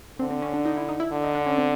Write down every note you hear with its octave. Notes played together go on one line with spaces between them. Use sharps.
D3 C4
C4
C#4
D4
D#4
E4
D#4
E4
D3
D#4
D4
C#4
C4